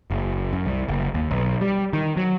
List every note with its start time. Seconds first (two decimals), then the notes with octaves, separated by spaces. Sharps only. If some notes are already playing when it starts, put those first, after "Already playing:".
0.11 F#1
0.53 F#2
0.66 C2
0.88 F#1
1.14 D#2
1.31 B1
1.61 G3
1.93 D#3
2.17 F#3